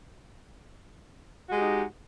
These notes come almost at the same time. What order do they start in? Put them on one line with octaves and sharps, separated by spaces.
F#4 G#3 G4 D#4